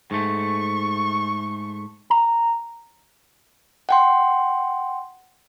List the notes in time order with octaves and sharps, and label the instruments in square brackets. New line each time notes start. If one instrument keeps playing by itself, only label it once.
[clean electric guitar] G#2 A3 [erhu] C#6
[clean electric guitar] A#5
[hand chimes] F#5 G5 C6